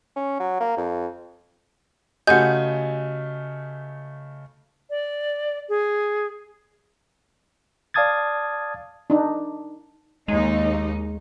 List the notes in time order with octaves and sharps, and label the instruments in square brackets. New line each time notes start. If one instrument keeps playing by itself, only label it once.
[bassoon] C#4
F#3
A#3
F2
[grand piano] C#3 A3 G#5 [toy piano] F#4 G4 [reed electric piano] D#5 [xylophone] F#5 G6
[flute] D5
G#4
[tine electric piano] D5 F5 A5 D#6 G#6 A6
[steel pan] D4 D#4
[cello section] D#2 D#4 [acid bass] G#3